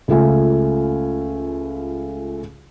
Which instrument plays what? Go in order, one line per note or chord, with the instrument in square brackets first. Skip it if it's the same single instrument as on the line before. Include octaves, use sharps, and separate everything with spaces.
[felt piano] C#2 A3 F4 G#5